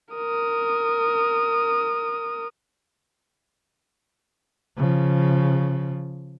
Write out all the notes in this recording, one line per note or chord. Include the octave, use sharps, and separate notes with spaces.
A#4 D#6
C#3 F3